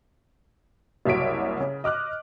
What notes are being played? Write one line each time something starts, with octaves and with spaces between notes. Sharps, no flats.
F#1 C2 F#3 C#5 B6 D7
C#3
D#5 D6 F6 F#6